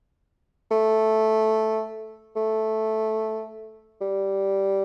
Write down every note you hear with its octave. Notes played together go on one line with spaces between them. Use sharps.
A3
A3
G3